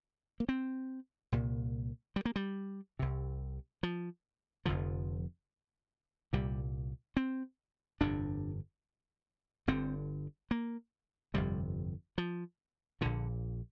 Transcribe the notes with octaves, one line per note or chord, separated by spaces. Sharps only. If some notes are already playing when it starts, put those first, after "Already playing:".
A#3
C4
C2 A#2
G3
A#3
G3
C2 C3
F3
F1 F2 D3 F3
C2 A#2 G3
C4
G1 F2 C3 D4
G1 G2 D3 C4
A#3
G1 F2 C3 G3
F3
A#1 A#2 D3